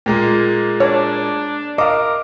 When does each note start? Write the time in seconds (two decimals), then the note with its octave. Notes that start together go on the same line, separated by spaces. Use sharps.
0.06 A#2 G#3 A#3
0.80 D4 C#5
1.78 A#4 D#5 F5 D6